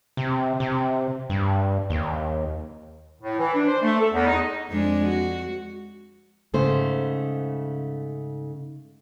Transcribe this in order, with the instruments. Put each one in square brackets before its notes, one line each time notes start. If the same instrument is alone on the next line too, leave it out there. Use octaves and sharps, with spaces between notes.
[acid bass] C3
C3
G2
D#2
[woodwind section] A2
E3
D4
C5
A3
A4
E2
D#4
[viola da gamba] F2 G#3 D4
F#4
[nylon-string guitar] G#2 C#3 A3 C5